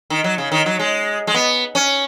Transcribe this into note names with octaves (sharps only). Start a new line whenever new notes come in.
D#3
F#3
C#3
D#3
F#3
G#3
G#3
B3
C#4